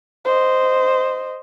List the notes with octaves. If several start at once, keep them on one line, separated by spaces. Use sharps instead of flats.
C5 D#5